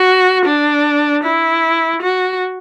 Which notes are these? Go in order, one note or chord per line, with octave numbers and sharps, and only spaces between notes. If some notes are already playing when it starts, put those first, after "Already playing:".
Already playing: F#4
D4
E4
F#4